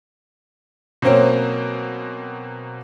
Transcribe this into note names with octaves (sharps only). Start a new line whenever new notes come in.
B2 F#3 A#3 C4 C#4